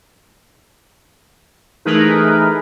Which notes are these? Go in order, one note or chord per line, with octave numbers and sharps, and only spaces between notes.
E3 A3 D#4 G#4 A#4 B4